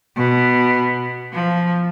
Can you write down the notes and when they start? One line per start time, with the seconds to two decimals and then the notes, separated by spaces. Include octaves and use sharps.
0.16 B2
1.33 F3